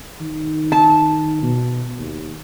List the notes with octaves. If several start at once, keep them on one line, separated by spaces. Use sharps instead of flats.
D#3
A5
B2
D#2